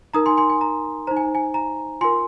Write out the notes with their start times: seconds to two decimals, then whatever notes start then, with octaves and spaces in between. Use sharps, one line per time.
0.14 D#4 A#4 A#5 D#6
0.26 G#5 C6
0.37 G#5 C6
0.50 G#5
0.61 A#5
1.07 D#4 C5 A#5
1.17 G#5
1.35 G#5
1.54 A#5
2.01 F4 A#4 G#5 C6